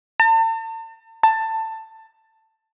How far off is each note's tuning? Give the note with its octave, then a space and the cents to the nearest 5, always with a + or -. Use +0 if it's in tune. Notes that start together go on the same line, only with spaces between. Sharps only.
A5 +40
A5 +15